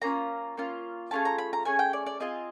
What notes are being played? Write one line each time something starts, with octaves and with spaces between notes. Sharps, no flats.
A#3 C#4 F4 A#5
A#3 C#4 F4
A3 C#4 F4 G#4 A5
A#5
B5
A#5
A3 C#4 G#4 G#5
G5
D5
D5
C4 F4 G#4 D#5